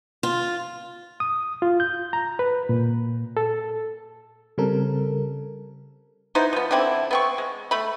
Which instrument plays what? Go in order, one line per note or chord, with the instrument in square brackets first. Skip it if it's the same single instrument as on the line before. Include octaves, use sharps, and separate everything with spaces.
[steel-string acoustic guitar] F4
[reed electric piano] D#6
F4
G6
A#5
B4
A#2
A4
[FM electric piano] C#3 G3 C4 A4 A#4
[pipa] B3 D#4 E4 C5
F3 B3
D3 E3 C4 E4
B3 C4 C#6
G#3
A3 B5